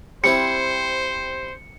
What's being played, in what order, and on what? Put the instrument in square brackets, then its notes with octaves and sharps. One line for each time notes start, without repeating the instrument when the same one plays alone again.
[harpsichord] G3 C4 E4 [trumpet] C5 [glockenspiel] C#7